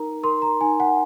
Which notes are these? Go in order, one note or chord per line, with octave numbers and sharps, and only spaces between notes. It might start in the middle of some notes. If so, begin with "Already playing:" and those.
Already playing: D#4 A#4 A#5
A#4 C6
A#5
D#4 G#5
F#5